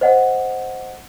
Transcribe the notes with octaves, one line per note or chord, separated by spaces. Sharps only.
C5 D#5 F#5